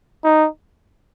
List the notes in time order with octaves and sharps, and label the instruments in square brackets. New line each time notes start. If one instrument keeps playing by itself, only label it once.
[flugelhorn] D#4